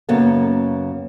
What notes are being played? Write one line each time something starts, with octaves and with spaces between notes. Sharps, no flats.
F#2 C#3 A#3 B3